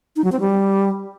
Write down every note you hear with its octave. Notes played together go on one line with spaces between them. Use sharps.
D#4
F#3
C4
G3